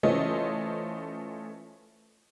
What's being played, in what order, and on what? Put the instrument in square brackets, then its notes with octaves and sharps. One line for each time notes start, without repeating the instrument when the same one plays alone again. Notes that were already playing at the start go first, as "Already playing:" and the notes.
[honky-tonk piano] E3 A3 C#4 F4 C5 D#5